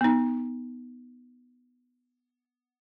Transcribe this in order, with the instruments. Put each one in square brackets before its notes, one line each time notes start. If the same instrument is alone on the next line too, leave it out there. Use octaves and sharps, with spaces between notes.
[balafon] B3 D#4